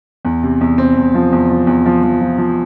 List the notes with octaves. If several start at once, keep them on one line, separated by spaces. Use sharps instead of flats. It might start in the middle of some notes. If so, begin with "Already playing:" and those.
E2
C3
E2
C4
E2
F3
E2
F3
E2
F3
F3
F3
F3